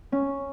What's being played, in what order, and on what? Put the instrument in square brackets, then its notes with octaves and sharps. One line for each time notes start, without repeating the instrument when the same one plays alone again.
[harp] C#4